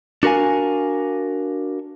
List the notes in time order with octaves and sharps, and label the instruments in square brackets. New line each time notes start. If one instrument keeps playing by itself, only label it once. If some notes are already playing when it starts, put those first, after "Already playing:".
[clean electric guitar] D4 F#4 A#4 F5 G#5